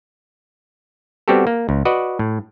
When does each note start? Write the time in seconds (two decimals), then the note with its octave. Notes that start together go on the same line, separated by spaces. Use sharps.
1.28 G3 B3 C4 F#4 G4 A4
1.47 A#3
1.69 C#2
1.85 F#4 B4 D5 D#5
2.19 A2